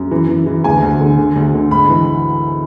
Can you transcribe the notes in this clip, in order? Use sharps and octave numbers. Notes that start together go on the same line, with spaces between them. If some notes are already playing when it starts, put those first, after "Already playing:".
Already playing: F#2
E3
E3
E3
D2 G#5
D2
D3
D3
D2
D3
G#2 B5
E3